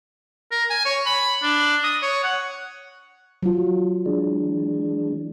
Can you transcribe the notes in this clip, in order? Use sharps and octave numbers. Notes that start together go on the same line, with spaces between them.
A#4
G#5
C#5
B5
D4
D#6
C#5
F#5
F#3 F4
E3 G#3 D4